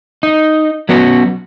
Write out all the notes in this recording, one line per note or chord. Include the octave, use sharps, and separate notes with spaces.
D#4
F#3 B3 C#4 F#4